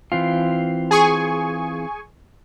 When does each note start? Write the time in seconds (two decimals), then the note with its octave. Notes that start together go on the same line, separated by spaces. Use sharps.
0.12 E3 C4 F4
0.91 G#4 G#5 C#6